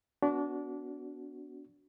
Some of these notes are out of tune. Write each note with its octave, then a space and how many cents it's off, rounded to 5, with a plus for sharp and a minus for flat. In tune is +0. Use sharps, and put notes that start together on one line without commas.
B3 +0 D4 -25 F#4 +0